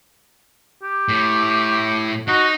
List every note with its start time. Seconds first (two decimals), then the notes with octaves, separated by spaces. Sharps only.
0.83 G4
1.08 A2
2.28 D#4 F#4